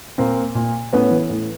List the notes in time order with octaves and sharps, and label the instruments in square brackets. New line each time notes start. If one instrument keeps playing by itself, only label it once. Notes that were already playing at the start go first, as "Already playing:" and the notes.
[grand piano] A#2 A#3 C4
A#2
A2 B3 C#4
E3
A2